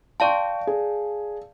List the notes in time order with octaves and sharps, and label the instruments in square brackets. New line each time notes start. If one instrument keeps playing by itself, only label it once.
[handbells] D5 F5 A5 [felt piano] G5 C6 C#6
[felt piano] G#4